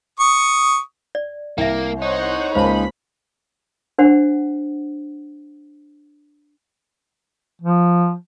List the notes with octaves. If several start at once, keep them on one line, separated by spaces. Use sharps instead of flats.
C#6 D#6
D5
C2 A#3 E5 G5
D#4 C5 C#5 F#5
C#2 G#3 A#3 C5 A5 B5
D4 C5 F#5
F3